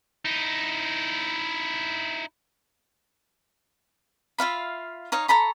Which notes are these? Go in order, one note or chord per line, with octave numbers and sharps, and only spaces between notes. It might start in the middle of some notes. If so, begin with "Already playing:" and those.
D#4 E4
F4 E5 F5 B5
D#4 C#5 F5
A4 A#5 B5 C#6